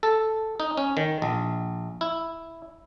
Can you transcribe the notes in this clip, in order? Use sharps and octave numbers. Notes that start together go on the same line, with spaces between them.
A4
D#4
C#4
D#3
A#1
E4